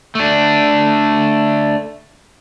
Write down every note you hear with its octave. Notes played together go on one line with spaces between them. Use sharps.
A3 D4